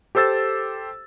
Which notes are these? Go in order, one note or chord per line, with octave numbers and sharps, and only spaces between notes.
G4 A4 C5 E6 A6